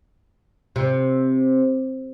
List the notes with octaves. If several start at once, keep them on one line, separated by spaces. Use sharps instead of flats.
C3